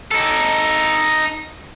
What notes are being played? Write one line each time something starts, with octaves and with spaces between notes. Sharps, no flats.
D#4 A4